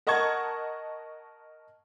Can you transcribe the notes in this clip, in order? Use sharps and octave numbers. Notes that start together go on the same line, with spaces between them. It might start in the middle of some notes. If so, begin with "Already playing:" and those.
A#4 D#5 F#5 A5 C#6 G#6